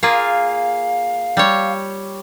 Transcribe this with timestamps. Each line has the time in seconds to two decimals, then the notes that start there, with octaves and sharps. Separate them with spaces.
0.03 A#3 F4 G#4 F5
1.37 G3 C#5